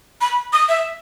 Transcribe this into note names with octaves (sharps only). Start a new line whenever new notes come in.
B5
D#6
E5